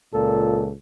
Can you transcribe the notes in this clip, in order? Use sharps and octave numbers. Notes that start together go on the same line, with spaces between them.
C#2 A#2 A4